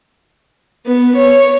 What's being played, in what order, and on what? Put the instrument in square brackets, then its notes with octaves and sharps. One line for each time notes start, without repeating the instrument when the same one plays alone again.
[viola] B3
C#5